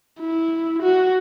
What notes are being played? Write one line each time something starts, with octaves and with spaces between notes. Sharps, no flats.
E4
F#4